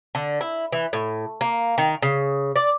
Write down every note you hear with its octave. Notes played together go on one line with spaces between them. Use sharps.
D3
E4
E3
A2
A#3
D#3
C#3
D5